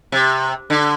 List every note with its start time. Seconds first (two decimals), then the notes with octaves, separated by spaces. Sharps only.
0.12 C3
0.70 D3